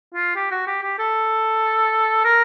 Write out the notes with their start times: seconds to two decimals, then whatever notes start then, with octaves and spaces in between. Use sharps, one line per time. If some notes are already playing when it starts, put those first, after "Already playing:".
0.15 F4
0.36 G4
0.51 F#4
0.67 G4
0.83 G4
0.99 A4
2.25 A#4